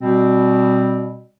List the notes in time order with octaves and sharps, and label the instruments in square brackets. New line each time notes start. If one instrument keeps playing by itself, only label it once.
[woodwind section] B2 G3 C4